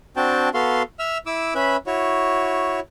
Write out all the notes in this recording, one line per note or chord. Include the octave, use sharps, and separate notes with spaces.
C4 D4 F#4 G5 A5
B3 F#4 A4 F5 C6
E5 E6 F6
E4 D6 E6
C#4 B4 E5 B5
E4 F#4 C#5